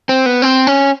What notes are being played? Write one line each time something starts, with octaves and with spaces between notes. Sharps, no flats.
C4
B3
C4
C#4